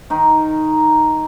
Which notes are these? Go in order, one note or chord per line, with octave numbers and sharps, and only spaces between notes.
D#3 D#4